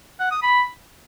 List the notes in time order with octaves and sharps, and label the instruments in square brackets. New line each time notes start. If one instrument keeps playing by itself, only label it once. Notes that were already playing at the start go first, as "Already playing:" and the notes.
[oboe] F#5
D#6
B5